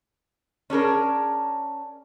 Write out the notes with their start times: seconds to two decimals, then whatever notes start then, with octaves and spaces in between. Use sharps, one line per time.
0.70 C#4 D4 G#4 A#4